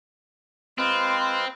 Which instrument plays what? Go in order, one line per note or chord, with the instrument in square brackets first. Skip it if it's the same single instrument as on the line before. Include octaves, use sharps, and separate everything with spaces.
[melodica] G#3 F4 B4 [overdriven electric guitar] C4